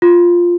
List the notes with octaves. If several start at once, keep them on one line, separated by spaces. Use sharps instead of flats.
F4